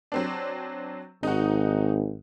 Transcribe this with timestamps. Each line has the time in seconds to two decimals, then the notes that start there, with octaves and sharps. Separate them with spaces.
0.12 F#3 C4 D4
1.23 G#1 D#4 F#4